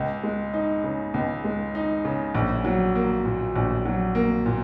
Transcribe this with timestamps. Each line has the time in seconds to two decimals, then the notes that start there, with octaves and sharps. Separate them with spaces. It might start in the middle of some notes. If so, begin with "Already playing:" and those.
Already playing: C#2
0.23 G#3
0.54 D#4
0.84 C#3
1.14 C#2
1.44 G#3
1.75 D#4
2.05 C#3
2.35 A#1
2.64 F#3
2.95 A#3
3.25 A#2
3.55 A#1
3.85 F#3
4.15 A#3
4.46 A#2